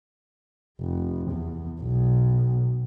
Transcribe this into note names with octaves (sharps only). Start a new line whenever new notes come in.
F1
E2
B1